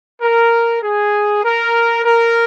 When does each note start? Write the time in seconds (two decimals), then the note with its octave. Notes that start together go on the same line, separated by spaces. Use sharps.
0.21 A#4
0.82 G#4
1.44 A#4
2.05 A#4